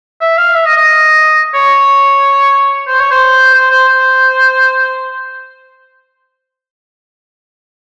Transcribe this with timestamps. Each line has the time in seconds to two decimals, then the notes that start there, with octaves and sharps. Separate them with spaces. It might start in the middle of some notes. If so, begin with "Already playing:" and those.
0.21 E5
0.37 F5
0.54 E5
0.66 D#5
0.76 D#5
1.54 C#5
2.87 C5
2.99 C#5
3.11 C5
3.54 C5
3.71 C5
3.88 C5